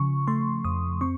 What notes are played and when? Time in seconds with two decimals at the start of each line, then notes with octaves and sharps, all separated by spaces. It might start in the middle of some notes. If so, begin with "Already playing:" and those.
Already playing: C#3 F3 C#6
0.27 A3 C6
0.65 F2 D#6
1.01 C4 C#6